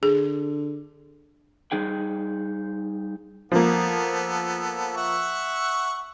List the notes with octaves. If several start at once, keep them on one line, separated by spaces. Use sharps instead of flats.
D3 G#4
G3 D#4 G#4 G5
F3 A#3 B3 A4
E5 F#5 C#6